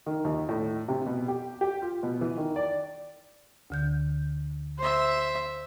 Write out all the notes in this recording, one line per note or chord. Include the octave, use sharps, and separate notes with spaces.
D#3
D#2
A2
C3
B2
G4
G4
F4
B2
E3
D#3
D5
D2 D3 G6
C5 E5